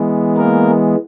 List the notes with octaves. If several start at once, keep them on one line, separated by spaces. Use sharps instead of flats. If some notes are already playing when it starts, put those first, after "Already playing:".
Already playing: E3 G#3 B3
A#3 A#4